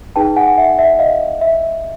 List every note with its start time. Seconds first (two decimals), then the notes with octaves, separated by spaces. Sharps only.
0.16 D#4 G#4 B4 G5 A5
0.36 F#5 G#5
0.57 E5 F#5
0.79 E5
0.99 D#5 F5
1.41 E5